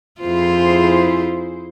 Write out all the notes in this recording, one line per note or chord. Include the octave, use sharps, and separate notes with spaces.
F2 E4 F4 G#4 C5